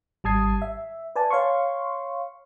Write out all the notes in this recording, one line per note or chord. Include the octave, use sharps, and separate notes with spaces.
G#1 G3 A5 D#6 G#6 C7
E5
B4 D5 G#5 A5
C#5 F5 C6 C#6